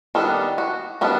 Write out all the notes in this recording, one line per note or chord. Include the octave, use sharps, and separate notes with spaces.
D#3 G3 B3 D4 A4
F#4
D#3 G3 B3 D4 F#4